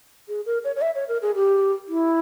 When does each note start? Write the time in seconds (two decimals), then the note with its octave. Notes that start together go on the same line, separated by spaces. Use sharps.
0.28 G#4
0.46 A#4
0.64 C#5
0.76 C#5
0.82 E5
0.95 C#5
1.08 A#4
1.22 G#4
1.35 G4
1.88 E4